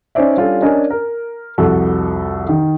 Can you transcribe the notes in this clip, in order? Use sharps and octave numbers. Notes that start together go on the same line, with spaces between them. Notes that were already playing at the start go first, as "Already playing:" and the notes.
C#4 D#4 C5 D5 E5
G3 C#4 D4 F4 G4 A4
C#4 D4 A#4 D#5 G#5
A#4
C2 F2 F#4 A4
D#3